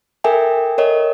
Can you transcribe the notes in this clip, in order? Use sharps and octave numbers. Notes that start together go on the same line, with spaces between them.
A4 A#4 E5 G5 G#5
A#4 C#5 D#5